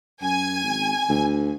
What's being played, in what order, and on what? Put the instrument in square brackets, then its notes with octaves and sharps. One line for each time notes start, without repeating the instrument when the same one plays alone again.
[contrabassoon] F#2 [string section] G#5
[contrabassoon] G#1
D2